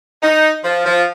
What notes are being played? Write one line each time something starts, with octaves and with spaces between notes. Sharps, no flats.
D#4
F3
F3